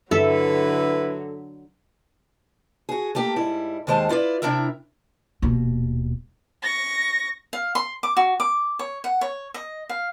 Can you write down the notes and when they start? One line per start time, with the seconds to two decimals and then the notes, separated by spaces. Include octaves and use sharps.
0.11 G2 D3 F#3 E4 A4 B4 E5
2.89 F#4 G#4
3.15 A3 A#3 G4
3.36 G#2 G3 E4
3.87 D#2 D#3 G#3 C5 A5
4.09 E4 F4 B4 D5
4.42 C3 D#3 D4 E4 A#4 E5
5.42 D#1 B2
6.62 C#6 A#6
7.53 F5
7.75 C6
8.03 D6
8.17 F#4
8.40 D6
8.79 C#5
9.04 F#5
9.21 C#5
9.54 D#5
9.89 F5